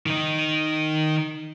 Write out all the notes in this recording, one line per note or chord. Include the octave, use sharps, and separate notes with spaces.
D#3 D#4